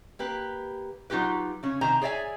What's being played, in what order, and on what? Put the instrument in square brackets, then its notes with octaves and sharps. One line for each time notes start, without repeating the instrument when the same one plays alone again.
[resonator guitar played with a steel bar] A#3 G4 B4
F#3 D#4 F4 G4 B4
C#3 C#4
C3 D#3 C5 G#5 A#5
G#4 C#5 D5 E5 G#5